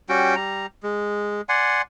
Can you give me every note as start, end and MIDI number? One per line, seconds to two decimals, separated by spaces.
0.09 0.35 55
0.09 0.35 61
0.09 0.35 66
0.09 0.35 79
0.36 0.66 55
0.36 0.66 82
0.83 1.41 56
1.49 1.82 74
1.49 1.82 78
1.49 1.82 80
1.49 1.82 84